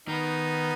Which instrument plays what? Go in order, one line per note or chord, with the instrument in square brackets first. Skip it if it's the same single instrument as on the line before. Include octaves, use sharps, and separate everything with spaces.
[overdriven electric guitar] D#3 [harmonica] B3 D#4